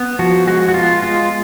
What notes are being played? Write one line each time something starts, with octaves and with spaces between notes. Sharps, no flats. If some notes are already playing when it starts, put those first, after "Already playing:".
Already playing: B3
F3 F#4
G#3 F#4
F#4
B3 F4
G#3 F4